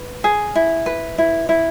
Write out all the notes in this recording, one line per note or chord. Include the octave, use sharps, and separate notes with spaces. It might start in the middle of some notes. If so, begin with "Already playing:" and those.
Already playing: B4
G#4
E4
B4
E4
E4